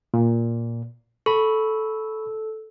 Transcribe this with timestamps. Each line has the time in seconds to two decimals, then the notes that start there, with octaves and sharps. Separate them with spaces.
0.14 A#2
1.26 A4 B5 C#6